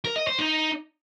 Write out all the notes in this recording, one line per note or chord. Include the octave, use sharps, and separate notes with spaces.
A#4
D#5
C5
D#4